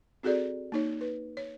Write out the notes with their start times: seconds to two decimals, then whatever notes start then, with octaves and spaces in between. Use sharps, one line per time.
0.23 C4 F#4 G#4 A4 D5
0.72 A#3 D#4 C#5
1.01 B4
1.37 C#5